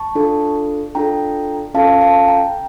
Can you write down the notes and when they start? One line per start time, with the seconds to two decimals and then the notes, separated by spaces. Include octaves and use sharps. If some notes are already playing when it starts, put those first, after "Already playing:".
Already playing: A5 C#6
0.15 D4 F4 A4
0.95 D4 F4 A4 G5 A#5
1.74 C#4 F4 A4 F5 A5
2.01 F5 A5
2.28 G5 A#5